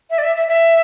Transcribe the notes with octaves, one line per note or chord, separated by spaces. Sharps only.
E5
D5
E5
E5
E5